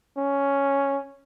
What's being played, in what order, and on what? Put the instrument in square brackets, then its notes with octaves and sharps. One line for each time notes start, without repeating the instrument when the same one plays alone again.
[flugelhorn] C#4